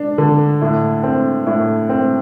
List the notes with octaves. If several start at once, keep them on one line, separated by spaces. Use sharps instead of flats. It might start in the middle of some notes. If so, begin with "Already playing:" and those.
Already playing: D4
D3
A2
C4
A2
C4